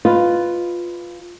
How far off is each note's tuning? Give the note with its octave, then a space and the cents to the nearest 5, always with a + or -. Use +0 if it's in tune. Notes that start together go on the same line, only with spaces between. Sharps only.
F4 +0 B4 +10 D#5 -5